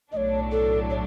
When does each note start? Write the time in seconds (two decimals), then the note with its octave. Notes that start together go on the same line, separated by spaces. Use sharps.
0.12 B1 A2 F#3 A3 D4 C#5 D#5
0.52 A4
0.90 C#5